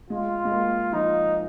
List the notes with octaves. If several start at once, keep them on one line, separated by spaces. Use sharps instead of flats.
G#3 F4
G#3
A#3
F3 D#4